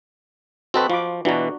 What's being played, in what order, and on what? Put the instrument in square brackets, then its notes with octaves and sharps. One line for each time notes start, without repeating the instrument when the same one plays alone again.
[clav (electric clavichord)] C4 A4 B4 [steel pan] F#4 D#5 B5
[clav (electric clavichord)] F3 [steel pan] F4 B5 D6
[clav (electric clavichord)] B2 E3 [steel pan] D4 F#4 A#5